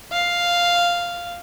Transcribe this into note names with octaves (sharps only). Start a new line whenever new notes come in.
F5